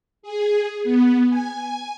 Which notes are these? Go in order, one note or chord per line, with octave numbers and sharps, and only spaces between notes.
G#4
B3
G#5